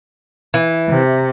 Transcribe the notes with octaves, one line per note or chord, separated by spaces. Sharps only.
E3
C3